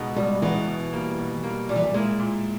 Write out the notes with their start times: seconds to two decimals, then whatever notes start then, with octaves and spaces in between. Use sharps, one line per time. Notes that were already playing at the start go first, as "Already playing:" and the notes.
Already playing: C#2 B2 G#3 B3 D#4
0.16 C#2 G3
0.42 B2 E3 G#3 B3 D#4
0.68 B2
0.93 G3 A#3
1.18 B2
1.43 G3 A#3
1.69 A#2 G3
1.76 E3
1.83 G3
1.94 G#3 A#3 E4
2.20 A#2